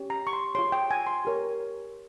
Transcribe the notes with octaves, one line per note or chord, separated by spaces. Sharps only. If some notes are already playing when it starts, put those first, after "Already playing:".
Already playing: C#4 G4 C#5
A#5
C#6
C6
F4 G#4 C#5 C6
G5
G#5
C6
G4 A#4 C#5